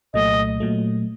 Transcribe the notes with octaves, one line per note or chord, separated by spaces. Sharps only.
C2 A#2 F#3 A3 D#5
A#2 F#3 A3